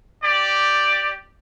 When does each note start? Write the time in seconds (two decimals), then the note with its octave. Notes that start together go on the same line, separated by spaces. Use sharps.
0.23 G4 D5